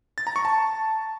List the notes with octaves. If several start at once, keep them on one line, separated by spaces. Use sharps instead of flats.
A6
A#5
C#6
A5